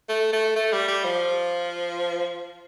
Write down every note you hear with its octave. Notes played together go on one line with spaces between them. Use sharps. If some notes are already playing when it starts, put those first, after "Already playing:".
A3
A3
A3
G3
G3
F3